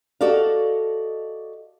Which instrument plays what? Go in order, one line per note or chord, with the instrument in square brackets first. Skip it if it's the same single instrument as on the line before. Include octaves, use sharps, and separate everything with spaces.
[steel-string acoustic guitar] F#4 A4 D5 D#5 F5